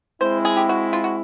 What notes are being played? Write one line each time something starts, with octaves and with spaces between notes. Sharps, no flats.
G#3 C4 E4 C5
G#4
G4
F#4
F4
F#4